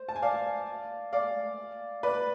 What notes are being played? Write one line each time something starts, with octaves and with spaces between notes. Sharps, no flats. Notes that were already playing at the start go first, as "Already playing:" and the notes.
Already playing: C5
A5
G#5
D5 F5
D5 F5
B4 D5